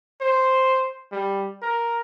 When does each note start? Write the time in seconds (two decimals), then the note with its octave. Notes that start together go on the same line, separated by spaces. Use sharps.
0.21 C5
1.12 G3
1.62 A#4